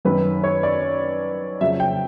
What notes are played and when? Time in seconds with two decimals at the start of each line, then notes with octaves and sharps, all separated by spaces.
0.05 F#2 D#3 F#3 B4
0.44 C#5
0.63 D5
1.61 F2 C#3 F#3 E5
1.80 G5